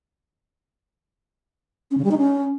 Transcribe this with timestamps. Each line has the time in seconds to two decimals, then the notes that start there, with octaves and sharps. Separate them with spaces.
1.91 C#4
1.98 C#3
2.04 G3
2.11 D#4
2.18 C#4